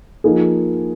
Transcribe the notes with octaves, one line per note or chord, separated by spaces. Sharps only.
F3 A#3 D#4 G#4